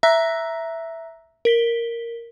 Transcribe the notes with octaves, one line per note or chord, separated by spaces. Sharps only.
E5 A#5 E6 F#6 A#6 B6
A#4 B6 G7